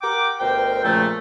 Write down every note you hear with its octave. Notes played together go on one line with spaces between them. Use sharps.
G4 A#4 F#5 G5 D6
D2 B2 A#4 C5 G5
A#2 C#3 F3 A3